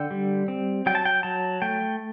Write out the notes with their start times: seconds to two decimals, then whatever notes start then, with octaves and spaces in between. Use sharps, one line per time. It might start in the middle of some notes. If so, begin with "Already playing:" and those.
Already playing: D3 G5
0.11 G3
0.48 C4
0.86 F#3 G5
0.95 A5
1.05 G5
1.23 F#3 A5
1.62 A3 G5